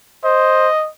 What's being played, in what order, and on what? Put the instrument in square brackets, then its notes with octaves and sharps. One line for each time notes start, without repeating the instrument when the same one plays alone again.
[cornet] C5 [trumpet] D#5